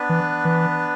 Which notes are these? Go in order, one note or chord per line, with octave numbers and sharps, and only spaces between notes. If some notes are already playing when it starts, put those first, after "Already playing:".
Already playing: B3 D4 B4
E3
E3